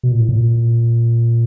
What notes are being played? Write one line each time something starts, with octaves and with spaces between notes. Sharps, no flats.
B2
A#2
A2
A#2